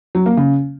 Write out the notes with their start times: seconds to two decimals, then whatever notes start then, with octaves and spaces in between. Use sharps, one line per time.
0.15 F#3
0.26 A#3
0.37 C#3